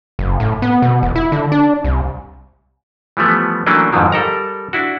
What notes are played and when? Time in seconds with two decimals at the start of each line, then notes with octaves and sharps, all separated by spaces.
0.19 F#1
0.40 A2
0.62 B3
0.82 B2
1.03 E1
1.16 E4
1.32 D3
1.52 D4
1.84 C2
3.17 E3 F3 G3 A3 B3
3.66 E3 F#3 A3 A#3 C#4 D4
3.92 F2 G#2 D3 D#3 F3 F#3
4.12 G3 A4 A#4 A#5
4.73 D4 E4 F#4